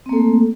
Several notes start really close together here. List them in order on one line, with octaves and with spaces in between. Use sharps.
C4 A#3 A4 A3